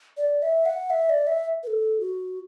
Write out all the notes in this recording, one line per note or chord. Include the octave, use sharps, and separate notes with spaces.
D5
E5
F#5
E5
D5
E5
B4
A4
F#4